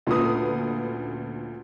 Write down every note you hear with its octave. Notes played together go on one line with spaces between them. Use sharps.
D2 A#2 C#4 F4 B4 D#6